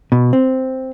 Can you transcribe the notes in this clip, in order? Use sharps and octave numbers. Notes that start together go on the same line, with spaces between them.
B2
C4